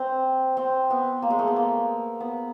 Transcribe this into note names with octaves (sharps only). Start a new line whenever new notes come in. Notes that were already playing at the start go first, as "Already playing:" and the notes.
Already playing: C4
C4
B3
A#3
G#3
A3
B3
A#3
B3